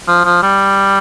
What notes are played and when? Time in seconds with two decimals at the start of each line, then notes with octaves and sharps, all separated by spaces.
0.08 F3
0.25 F3
0.43 G3